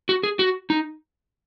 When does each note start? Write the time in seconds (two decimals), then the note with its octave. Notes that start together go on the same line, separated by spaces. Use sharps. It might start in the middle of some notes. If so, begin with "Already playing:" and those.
0.09 F#4
0.23 G#4
0.39 F#4
0.70 D#4